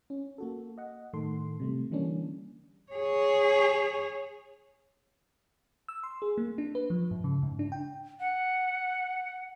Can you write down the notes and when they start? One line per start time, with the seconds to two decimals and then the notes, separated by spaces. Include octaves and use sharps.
0.10 C#4
0.38 A#3 F#4 A4
0.78 D#5 F#5
1.13 A2 D#3 A4 C6
1.60 C3 G3 A3
1.91 D3 E3 G3 A#3 C#4 D4
2.92 G#4 C#5
5.88 E6
6.03 C6
6.22 G#4
6.38 A#3
6.58 D4
6.75 B4
6.90 F3
7.11 G#2
7.24 C#3
7.43 G#2
7.59 D4
7.72 G5
8.20 F#5